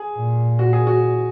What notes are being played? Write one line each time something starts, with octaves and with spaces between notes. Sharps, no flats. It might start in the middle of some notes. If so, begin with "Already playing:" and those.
Already playing: G#4
A#2
F#4
G#4
F#4